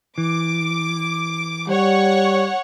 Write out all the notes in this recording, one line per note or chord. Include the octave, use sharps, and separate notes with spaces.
E3 D6
G3 C#5 F#5